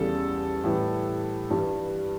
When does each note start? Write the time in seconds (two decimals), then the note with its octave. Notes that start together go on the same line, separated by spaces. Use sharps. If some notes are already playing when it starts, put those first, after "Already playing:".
Already playing: E2 C#3 G3 A4
0.64 A2 E3 G3
1.50 G2 E3 G3